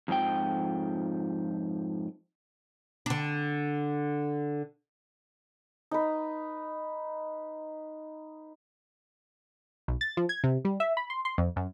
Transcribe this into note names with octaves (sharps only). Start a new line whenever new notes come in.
F2 G#2 F3 G5
D3 D4
D#4 B4
B1
A6
F3
G#6
C3
G3
E5
B5
C6
C6
F2
F#2